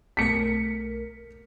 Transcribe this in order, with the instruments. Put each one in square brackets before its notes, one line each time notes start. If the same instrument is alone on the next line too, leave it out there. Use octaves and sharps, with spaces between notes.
[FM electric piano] B1 A3 A#4 [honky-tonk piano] B6 C#7